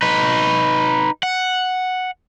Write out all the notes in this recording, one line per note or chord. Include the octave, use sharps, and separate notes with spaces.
D#4 B4
F#5